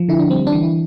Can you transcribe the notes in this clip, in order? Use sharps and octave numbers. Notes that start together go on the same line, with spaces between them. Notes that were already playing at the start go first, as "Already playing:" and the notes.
Already playing: F3
D3 E4
D4
G3 C4
D4
E3
E4